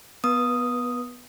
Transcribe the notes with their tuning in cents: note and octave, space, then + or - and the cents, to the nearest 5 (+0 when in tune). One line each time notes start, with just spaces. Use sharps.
B3 +0 B4 -30 D#6 +0